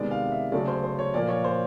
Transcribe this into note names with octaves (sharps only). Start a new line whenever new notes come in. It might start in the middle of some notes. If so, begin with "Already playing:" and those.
Already playing: C3 D#3 G#3 B3 D5
F5
E5
C#3 F#3 A3 D5
C5
C5
C#5
A#2 F3 A#3 D5
C#5
C5